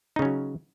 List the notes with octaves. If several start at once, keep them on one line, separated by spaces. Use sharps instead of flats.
C#3 F#3 C#4 D#4